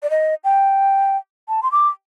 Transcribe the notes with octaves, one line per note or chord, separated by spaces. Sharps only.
D5
D#5
G5
A5
C6
D6